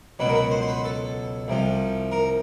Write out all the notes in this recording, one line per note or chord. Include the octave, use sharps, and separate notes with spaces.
C#2 B2 F#3 B4
A#4
B4
C5
C5
B4
A4
C2 C3 F3
A#4